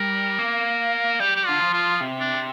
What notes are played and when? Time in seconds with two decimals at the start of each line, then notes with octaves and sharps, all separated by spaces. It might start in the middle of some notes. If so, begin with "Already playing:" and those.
Already playing: G3 A#4
0.39 A#3
1.20 G3 G4
1.36 G4
1.46 D3 F4
1.60 F3
1.74 F4
2.00 C3
2.20 D4